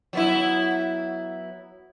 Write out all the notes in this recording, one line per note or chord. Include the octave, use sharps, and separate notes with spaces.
F#3 B3 E4